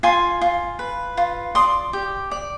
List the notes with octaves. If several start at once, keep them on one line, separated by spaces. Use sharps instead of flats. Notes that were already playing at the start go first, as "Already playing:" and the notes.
F4 G#5 C6
F4
B4
F4
D5 C6 D#6
G4
D5